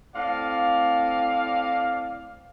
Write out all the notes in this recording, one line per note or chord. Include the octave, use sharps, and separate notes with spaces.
A2 C4 D5 F5